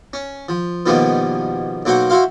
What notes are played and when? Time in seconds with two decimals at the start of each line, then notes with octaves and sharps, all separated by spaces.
0.13 C#4
0.49 F3
0.86 B2 D#3 F3 G3 A#3 B3
1.85 B1 A#3 F#4 C5 F#5
2.10 E4 F#4 C5 F5